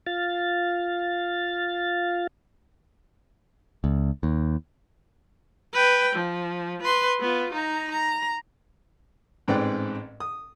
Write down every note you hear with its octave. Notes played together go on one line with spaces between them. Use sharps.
F4 F5 A6
C#2
D#2
B4 G5
F3
B4 C6
B3 F4
D#4 A#5
A#5
A1 G#2 C4 B4 D5 G5
D#6